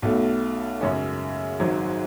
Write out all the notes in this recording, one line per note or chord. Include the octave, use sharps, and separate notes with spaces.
B1 B2 A3
F#2 C#3 G#3 C#4
G#1 G#2 F#3